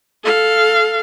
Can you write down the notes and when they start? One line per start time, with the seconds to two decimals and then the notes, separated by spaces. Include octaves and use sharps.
0.24 A4 F5